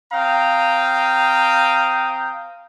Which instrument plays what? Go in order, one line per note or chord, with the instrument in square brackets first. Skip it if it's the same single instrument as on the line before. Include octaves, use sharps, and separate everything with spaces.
[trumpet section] C4 F5 G5 A#5 D#6